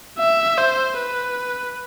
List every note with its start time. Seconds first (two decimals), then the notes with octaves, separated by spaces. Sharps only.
0.19 E5
0.58 C5
0.98 B4